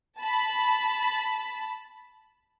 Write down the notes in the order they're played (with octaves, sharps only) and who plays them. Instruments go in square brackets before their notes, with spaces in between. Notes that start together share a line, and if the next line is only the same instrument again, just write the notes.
[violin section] A5 B5